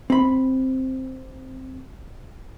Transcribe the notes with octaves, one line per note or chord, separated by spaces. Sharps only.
C4 B5